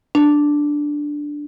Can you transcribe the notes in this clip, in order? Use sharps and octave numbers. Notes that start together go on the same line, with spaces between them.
D4